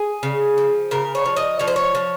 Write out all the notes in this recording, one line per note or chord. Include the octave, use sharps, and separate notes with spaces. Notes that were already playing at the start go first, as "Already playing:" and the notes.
Already playing: G#4
C#3
F3
C#3 A#4
C#5
F3
D#5
F3 C#5
C5
C#5
F3